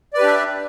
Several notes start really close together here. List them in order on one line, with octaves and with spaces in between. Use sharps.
D5 B4 G4 D4 E5